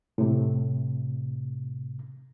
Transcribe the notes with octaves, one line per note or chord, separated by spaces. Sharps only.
A2 C3